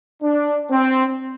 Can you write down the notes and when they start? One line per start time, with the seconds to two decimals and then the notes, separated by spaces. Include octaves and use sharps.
0.23 D4
0.71 C4